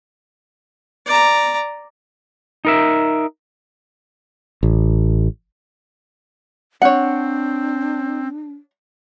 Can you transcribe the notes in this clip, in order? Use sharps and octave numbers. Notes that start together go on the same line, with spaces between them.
D5 A#5
D#4 A#4 E5
A1
C4 D4 C#5 F#5